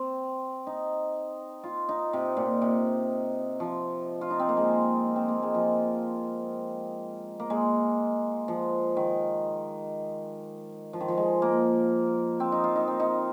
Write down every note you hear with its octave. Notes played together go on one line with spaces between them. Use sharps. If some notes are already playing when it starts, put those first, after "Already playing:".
Already playing: C4
D#4
F4
D#4
C3
A#2
C3
F3
F4
D#4
C4
A#3
G#3
C4
A#3
G#3
F3
A#3
G#3
F3
D#3
F3
D#3
F3
G#3
A#3
C4
D#4
F4
D#4
C4
D#4